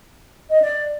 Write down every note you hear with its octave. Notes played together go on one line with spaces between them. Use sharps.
D#5
D5